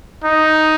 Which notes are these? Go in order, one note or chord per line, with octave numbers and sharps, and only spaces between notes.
D#4